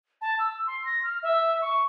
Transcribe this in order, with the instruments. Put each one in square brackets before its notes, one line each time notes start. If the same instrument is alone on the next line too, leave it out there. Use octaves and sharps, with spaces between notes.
[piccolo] A5
E6
C6
A#6
F6
E5
C#6